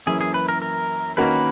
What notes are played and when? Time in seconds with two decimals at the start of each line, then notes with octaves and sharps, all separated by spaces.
0.06 F#2 E3 A#3 C#4 E4 G#4
0.21 G#4
0.34 B4
0.49 A#4
0.62 A#4
1.17 D#3 A#3 C#4 F#4 A#4 B4